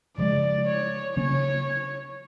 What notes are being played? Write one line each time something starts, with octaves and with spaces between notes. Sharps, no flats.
C#3 F3 G#3 D5
C#5
C#3 F#3 A#3 C#4 C#5